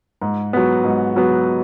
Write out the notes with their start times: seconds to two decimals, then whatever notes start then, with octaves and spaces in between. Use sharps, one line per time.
0.22 G#2
0.53 F#3 B3
0.84 G#2
1.16 F#3 B3